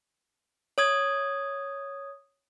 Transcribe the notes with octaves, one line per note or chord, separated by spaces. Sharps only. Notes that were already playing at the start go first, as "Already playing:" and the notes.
C#5 D#6 G#6